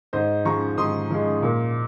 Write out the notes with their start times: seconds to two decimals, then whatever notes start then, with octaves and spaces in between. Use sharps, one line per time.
0.13 G#2 C5 D#5
0.45 F3 G#3 A#5 C#6
0.78 G#2 C6 D#6
1.10 F3 G#3
1.42 A#2